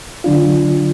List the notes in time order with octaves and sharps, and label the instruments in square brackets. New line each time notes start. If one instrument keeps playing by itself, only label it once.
[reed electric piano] D3 F#3 D4 F4